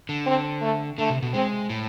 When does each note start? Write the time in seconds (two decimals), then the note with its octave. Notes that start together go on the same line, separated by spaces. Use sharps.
0.09 D3
0.27 C4
0.62 A3
0.98 D3 A3
1.10 C3
1.22 B2
1.34 G#3 C4
1.69 A2